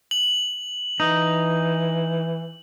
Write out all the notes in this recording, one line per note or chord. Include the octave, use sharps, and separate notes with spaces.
F#7
E3 D#4